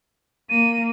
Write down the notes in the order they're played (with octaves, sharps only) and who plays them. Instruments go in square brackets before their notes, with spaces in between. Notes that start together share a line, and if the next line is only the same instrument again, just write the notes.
[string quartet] A#3 [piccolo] D#7